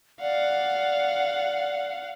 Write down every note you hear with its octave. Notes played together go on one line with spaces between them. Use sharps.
D5 F5 F#5